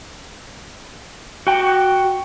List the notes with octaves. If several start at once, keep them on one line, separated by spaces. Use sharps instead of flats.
F#4 G5